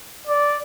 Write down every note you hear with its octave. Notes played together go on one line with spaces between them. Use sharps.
D5